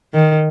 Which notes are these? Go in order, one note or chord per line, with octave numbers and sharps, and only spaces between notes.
D#3